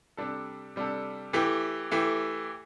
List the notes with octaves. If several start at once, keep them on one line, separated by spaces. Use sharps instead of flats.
C3 G3 D4 A4
C3 G3 D4 A4
E3 A3 E4 G4
E3 A3 E4 G4